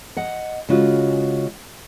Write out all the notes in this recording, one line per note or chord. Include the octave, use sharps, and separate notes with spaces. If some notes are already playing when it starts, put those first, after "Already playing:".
D#5 F#5
C#3 G#3 C#4 F4 F#4